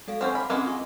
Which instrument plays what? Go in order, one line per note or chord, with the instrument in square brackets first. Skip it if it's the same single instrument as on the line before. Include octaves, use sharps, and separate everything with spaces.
[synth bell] G#3 A4 F5
[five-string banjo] C4 C#4 C5 [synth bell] F#5
[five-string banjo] B5 [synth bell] D6 F6
[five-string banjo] E3 G#3 A#3 [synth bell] C4 C#4 G#4
[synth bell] F4 C#6